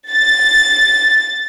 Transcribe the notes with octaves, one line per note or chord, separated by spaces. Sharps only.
A6